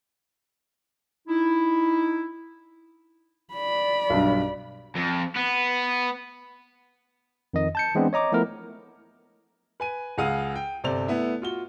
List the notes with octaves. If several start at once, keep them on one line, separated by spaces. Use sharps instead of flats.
D#4 E4
D5 B5
B1 G2
F2
B3
F2 D#3 D#5
A5 G6 C#7
E3 G#3 B3 C4 D4
C#5 D#5 A#5 D6
F3 A3 B3 E4 A#4
B4 G#5 D#7
C#2 G#4 F5 F#5 D#6 D#7
G5
G1 C3 C5 D5 F7
A3 B3 E4
F4 F#4 G7